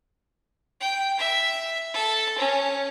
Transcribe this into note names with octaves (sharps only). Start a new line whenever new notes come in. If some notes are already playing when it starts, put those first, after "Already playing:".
G5
E5
A4
C#4